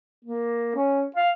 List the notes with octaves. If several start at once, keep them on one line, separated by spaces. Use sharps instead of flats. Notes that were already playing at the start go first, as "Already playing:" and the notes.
A#3
C#4
F5